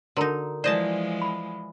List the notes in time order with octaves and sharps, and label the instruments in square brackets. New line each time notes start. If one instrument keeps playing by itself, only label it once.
[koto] D3 D#4 [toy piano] F#4 A#4 A#5
[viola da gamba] E3 F3 G#3 [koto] C5 D#5 A5 [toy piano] D5
[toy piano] B5